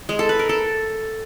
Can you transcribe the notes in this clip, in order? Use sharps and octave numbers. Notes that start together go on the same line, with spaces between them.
G#3
A4
B4
A#4
A4